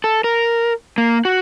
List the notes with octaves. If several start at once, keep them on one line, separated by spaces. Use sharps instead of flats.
A4
A#4
A#3
F#4